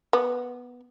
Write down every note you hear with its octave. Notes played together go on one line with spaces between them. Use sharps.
B3